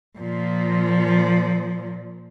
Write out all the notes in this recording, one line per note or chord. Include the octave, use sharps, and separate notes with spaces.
A#2 F3